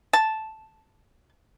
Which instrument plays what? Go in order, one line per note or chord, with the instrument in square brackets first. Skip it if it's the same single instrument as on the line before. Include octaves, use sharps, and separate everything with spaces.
[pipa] A5